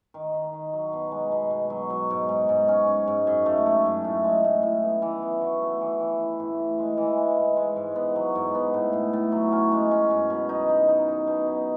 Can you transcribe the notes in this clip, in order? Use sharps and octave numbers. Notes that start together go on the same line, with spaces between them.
D#3
D#3
D#3
F#3
B2
G#3
B2
B2
F#3
F#3
G#2
G#2
G#2
C#4
C#4
G#2
F#2
A3
A3
F#2
A2
G#3
A2
A2
B3
E3
B3
F#4
A3
E3
E3
E4
A2
A2
G#3
E3
G#3
G#2
G#3
G#2
B3
F#3
G#2
B3
A2
A2
A2
F#3
C#4
G#3
C#4
F#2
B2
D#4
D#4
D#4
D#4
B2
D#4